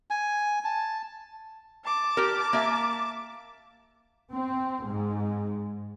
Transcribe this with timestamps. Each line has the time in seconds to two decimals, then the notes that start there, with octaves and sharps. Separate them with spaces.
0.10 G#5
0.64 A5
1.84 A5 D6
2.17 G4 A#4
2.53 A#3 E5
4.32 C4
4.84 G#2